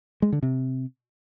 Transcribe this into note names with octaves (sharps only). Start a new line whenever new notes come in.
G#3
D3
C3